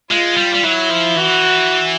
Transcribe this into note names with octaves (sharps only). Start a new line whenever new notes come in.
G#3 F4
G3
G3
F#3 E4
F3
E3 F#4